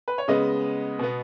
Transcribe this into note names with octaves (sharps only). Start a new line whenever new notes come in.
B4
C#5
C#3 G#3 B3 D#5
B2 B3